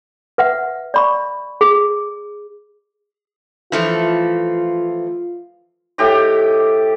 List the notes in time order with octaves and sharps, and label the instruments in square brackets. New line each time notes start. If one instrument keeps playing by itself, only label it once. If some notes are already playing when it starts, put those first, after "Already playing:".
[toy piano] B4 E5 F#5
D5 B5 C#6
G#4
[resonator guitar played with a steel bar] E3 F3 A3 [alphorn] F4
[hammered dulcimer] A2 G4 D#5